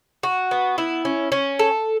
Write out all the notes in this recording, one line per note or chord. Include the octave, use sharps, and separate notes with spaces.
F#4
B3
E4
C#4
C#4
A4